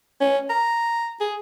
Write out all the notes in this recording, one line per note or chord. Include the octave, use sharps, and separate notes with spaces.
C#4
A#5
G#4